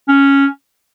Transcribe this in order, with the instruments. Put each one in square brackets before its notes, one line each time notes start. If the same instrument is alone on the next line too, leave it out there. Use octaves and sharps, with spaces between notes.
[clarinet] C#4